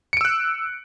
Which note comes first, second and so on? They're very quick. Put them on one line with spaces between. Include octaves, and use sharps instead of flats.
C#7 D7 E6 F#6